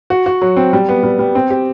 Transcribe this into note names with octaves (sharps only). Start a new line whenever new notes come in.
F#4
F#4
F#3
C4
G3
B3
G3
G3
C4
G4